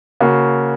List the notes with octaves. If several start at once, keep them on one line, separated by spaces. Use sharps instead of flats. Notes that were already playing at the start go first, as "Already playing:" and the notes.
C#3 A#3 F#4